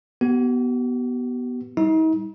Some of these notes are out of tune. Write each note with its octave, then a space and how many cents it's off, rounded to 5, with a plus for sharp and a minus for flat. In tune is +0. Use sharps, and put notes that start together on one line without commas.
B3 -5 G4 -45
G3 +0 D#4 +40